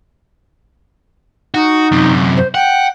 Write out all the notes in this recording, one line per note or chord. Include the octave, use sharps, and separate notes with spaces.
D#4 F#4
F#2 C3
C5
F#5 G5